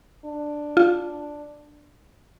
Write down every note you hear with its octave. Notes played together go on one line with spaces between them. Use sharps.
D4
F4